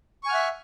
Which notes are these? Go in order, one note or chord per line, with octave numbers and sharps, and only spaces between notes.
E5 F#5 G#5 C#6 F6